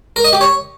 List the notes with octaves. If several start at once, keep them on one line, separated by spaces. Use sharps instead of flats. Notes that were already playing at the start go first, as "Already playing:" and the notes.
A#4
D#5
G4
C#5